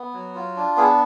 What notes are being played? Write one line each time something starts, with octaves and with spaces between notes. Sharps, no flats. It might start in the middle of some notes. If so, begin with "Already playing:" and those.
Already playing: B3
F#3
F4
D4
B3 G#4